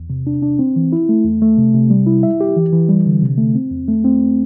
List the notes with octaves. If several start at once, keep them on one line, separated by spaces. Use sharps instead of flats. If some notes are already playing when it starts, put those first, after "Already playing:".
Already playing: E2
C3
D4
D4
C4
E3
E4
A3
E2
A3
C3
C3
G3
E4
E5
G4
E3
E3
G3
D3
C3
A3
C4
E2
A3
C4